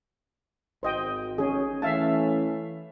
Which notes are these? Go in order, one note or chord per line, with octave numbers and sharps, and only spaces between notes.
G#1 C5 D#5 G5
C#4 G#4
E3 A3 C#4 E5 F5 A5